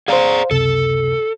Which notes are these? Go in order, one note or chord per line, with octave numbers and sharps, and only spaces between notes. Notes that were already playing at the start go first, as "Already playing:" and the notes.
G#4 C5 D5 F5 A#5
C#2 F#2 C3 A4